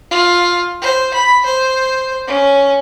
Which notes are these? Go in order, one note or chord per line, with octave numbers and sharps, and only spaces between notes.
F4
C5
B5
C5
C#4